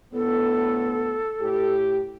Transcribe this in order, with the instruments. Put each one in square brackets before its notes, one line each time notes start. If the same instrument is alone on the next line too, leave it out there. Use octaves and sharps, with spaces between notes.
[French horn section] D2 A2 B3 [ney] A4
[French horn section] A2 G4